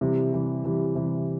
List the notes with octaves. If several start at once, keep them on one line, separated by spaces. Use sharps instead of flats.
C3 E3 G3
C3 E3 G3
C3 E3 G3
C3 E3 G3